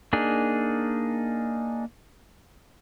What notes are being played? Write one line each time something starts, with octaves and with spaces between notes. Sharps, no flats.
A#3 D4 D#4 G#4